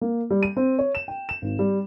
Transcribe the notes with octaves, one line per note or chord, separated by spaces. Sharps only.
A#3
G3
D#7
C4
C#5
E7
G5
E7
G#1
G3